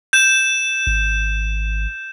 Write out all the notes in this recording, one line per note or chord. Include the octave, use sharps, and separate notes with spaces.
G6 E7
G#1